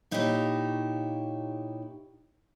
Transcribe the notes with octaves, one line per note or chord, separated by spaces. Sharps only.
A#2 D#4 E4 G4 G#4 C#5